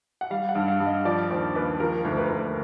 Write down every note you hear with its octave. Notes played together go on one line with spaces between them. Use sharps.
F#5
G3 F5
F#5
G2
F5
G2
D#5
F3 D5
D#2 C5
D#2 B4
F3 A#4
D2
B4
D2